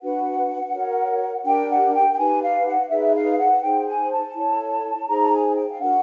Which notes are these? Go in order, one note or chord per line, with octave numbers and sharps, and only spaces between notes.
D4 F#4 B4 F#5
F#4 A#4 C#5
D4 G4 A#4 G5
F#5
G5
G5
D#4 G4 B4 G#5
F5
F#5
D#4 G#4 B4 E5
F5
F#5
D#4 G#4 C5 G5
G#5
A5
E4 A4 C#5
D#4 G#4 C5 A#5
A5
G#5
G5
F5
D4 F#4 A#4 F#5